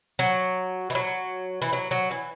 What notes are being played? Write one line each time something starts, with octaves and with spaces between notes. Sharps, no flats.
F#3
E3
F#3
E3
F#3
F#3
E3